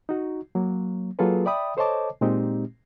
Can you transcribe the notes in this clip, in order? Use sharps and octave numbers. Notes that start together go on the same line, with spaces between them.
D#4 F#4
F#3 A#3
F#3 A#3 F4 G#4 A4 B4
D5 E5 G5 B5 D#6
A4 C5 C#5 D#5 A5 D6
A#2 G#3 C4 D#4 G4